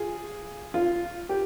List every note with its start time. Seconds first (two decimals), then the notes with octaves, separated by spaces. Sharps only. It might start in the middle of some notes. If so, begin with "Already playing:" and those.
Already playing: F4 G#4
0.74 F4
1.29 G4